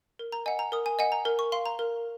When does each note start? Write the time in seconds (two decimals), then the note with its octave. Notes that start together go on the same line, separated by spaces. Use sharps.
0.19 A#4
0.32 A#5
0.46 D#5 F#5 G#5
0.59 A#5
0.72 A#4 D#6
0.86 G#5
0.99 D#5 F#5 G#5
1.12 A#5
1.25 A#4
1.39 C#6
1.52 F5 C6
1.66 A#5
1.79 A#4